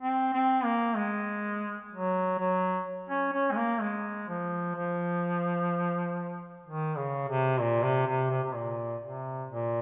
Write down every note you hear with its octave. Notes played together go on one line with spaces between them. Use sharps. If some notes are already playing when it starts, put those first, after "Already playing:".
C4
C4
A#3
G#3
F#3
F#3
C#4
C#4
G#3
A#3
G#3
F3
F3
D#3
C#3
C3
A#2
C3
C3
C3
C3
A#2
C3
A#2